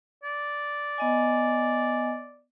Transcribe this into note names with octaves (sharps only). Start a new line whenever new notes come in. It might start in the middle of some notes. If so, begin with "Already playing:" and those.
D5
B3 D#5 G#5